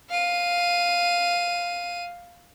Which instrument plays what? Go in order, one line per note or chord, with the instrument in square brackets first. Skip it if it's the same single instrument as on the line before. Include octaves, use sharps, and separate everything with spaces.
[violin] F5 D#7